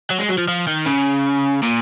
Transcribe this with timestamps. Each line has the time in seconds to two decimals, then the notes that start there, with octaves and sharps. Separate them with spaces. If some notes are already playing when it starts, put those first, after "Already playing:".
0.10 F#3
0.19 G#3
0.29 F#3
0.38 F3
0.48 F3
0.67 D#3
0.86 C#3
1.62 A#2